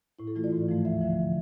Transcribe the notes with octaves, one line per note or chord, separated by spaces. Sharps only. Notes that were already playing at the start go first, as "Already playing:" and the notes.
A2 E4
A4
E3 A3 F4
D5
G#2
F3 A3
D2 E5
D3 F3